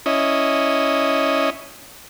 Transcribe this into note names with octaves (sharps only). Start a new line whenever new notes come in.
C#4 E4 D#5